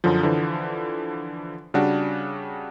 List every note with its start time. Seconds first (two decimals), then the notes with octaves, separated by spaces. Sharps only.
0.04 F#2 D3 F3
0.23 D3 E3 F3
1.74 C#3 G3 D4 F#4